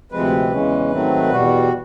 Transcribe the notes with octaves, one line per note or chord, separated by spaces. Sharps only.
D2 C3 F3 G#3 C4 B4
E2 C#3 E3 G#3 C#4
G#2 D#3 F#3 A3 C4
E2 B2 G3 F#4